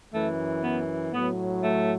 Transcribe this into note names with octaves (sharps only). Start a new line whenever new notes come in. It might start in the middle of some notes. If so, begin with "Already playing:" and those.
F#2 E3 A3
B3
A2 F#3 B3
A3